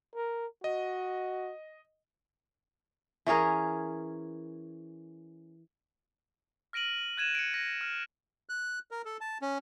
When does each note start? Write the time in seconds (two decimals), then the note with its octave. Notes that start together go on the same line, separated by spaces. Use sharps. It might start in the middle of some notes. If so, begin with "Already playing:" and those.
0.15 A#4
0.64 F#4 D#5
3.26 E3 C#4 G#4 A#4
6.73 F6 A#6 D7 D#7 F#7
7.17 F#6 G#6 D#7 E7
7.35 C#7 D7
7.54 A#6
7.81 F6
8.49 F#6
8.91 A#4
9.05 A4
9.21 A5
9.42 C#4